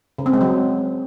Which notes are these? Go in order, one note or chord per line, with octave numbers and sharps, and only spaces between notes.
C#3
C4
G#3
F#3